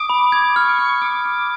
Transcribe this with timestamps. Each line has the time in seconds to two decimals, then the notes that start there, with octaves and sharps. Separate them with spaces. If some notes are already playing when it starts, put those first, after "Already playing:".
Already playing: D6 D#6
0.09 B5
0.32 G#6
0.56 C#6 F6
0.78 F6
1.02 D6 F6
1.25 F6